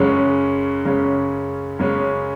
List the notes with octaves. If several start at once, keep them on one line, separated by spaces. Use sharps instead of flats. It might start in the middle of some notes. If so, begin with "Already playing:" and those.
Already playing: F#2 C#3 G#3 C#4
F#2 C#3 G#3 C#4
F#2 C#3 G#3 C#4